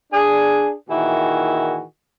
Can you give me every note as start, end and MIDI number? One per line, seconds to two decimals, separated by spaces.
0.12 0.73 62
0.12 0.73 68
0.89 1.82 46
0.89 1.82 51
0.89 1.82 52
0.89 1.82 64
0.89 1.82 66
0.89 1.82 68